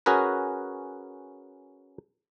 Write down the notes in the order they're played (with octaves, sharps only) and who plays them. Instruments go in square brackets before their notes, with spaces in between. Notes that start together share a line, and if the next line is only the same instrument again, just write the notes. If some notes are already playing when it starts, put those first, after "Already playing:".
[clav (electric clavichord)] C#4 F#4 G#4 A#4 B4